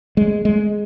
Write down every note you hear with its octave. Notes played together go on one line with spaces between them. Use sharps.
G#3
G#3